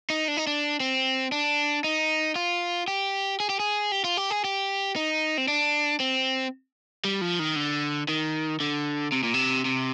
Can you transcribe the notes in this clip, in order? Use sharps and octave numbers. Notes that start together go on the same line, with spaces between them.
D#4
D4
D#4
D4
C4
D4
D#4
F4
G4
G#4
G4
G#4
G4
F4
G4
G#4
G4
D#4
C4
D4
C4
G3
F3
D#3
D3
D#3
D3
C3
A#2
C3
C3